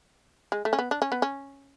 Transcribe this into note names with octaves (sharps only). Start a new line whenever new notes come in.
G#3
A3
C#4
B3
D4
C#4
B3
C#4